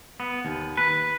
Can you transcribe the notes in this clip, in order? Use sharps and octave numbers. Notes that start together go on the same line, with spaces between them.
B3
D#2
B4